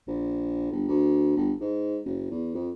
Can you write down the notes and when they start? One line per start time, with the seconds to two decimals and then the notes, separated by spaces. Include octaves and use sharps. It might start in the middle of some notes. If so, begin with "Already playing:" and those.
0.08 A#1
0.71 G1
0.89 D2
1.37 G1
1.61 G#2
2.05 F#1
2.31 E2
2.55 F2